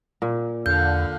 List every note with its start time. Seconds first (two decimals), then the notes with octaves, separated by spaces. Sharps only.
0.22 A#2
0.66 E2 D3 F5 G6